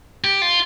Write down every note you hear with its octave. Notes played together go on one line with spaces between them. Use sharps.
G4
F4